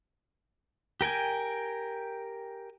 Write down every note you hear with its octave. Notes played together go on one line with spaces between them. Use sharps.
G4 A#4 G5 G#5